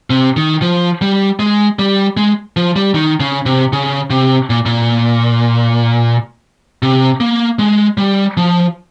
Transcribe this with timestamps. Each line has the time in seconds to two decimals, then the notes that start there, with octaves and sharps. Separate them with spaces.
0.10 C3
0.37 D#3
0.62 F3
1.01 G3
1.39 G#3
1.79 G3
2.17 G#3
2.57 F3
2.76 G3
2.94 D#3
3.20 C#3
3.46 C3
3.73 C#3
4.10 C3
4.50 A#2
4.66 A#2
6.83 C3
7.20 A#3
7.59 G#3
7.98 G3
8.37 F3